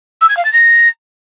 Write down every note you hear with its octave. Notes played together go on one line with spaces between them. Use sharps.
E6
G#6
F5
A6
A#6